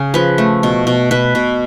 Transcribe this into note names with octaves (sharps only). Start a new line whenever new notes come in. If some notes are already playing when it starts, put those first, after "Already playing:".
Already playing: C#3 G#4
F3 B4
A3
B2
B2
B2 B4
B2